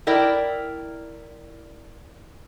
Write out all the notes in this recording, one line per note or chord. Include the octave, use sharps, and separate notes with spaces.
E4 A#4 D5 G5